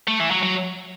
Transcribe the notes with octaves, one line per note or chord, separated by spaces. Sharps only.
A3
E3
F#3
F#3